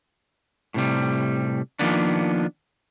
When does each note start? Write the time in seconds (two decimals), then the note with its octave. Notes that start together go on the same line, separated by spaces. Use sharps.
0.74 A2 C3 G3
1.79 D#3 F3 A#3 B3 D4